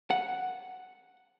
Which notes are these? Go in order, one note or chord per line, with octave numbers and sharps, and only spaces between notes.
F#5